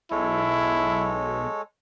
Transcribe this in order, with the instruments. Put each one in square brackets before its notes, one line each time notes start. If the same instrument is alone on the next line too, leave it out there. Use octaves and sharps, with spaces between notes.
[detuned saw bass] B1 [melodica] G#3 A4 C#5 [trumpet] E4